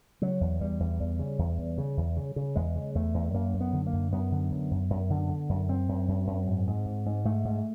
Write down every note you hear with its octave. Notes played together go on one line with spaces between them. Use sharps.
C#3 F#3
E2
E2 G3
E2
E2
C#3
E2
E2
C#3
E2
C#3
C#3
E2 G#3
C#3
E2 A3
E2
F#2 A#3
F#2
B3
D3
A#3
F#2
F#2 B3
D3
F#2
F#2
F#2
D3
D3
F#2
F#2 C4
F#2
F#2
F#2
G#2
G#2
G#2
G#2
G#2 A3
G#2